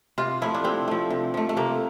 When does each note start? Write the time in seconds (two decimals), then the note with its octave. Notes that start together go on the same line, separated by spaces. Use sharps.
0.18 C3 F4
0.42 F3 A3 E4
0.54 D4
0.64 C3 C4
0.88 F3 A3
1.10 C3
1.34 F3 A3
1.49 A3
1.57 C3 A#3